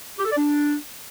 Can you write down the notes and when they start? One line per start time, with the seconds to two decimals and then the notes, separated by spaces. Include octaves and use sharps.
0.19 G4
0.25 A4
0.31 D5
0.38 D4